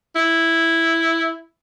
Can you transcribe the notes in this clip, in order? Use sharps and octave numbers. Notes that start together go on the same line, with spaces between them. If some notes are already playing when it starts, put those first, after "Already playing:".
E4